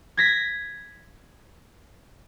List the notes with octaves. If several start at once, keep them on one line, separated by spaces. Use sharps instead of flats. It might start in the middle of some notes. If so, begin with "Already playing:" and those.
G#6 A#6 B6